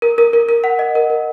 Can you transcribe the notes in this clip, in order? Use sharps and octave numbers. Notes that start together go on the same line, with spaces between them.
A#4
A#4
A#4
A#4
F#5
D#5
A#4
A#4